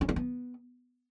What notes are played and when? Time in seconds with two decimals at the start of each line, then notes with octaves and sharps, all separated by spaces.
0.01 C#4
0.09 A#3
0.16 B3